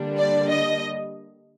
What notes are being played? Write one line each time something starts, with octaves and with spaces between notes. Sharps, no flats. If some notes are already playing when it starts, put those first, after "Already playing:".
Already playing: D3 G3 A#3 D4
D5
D#5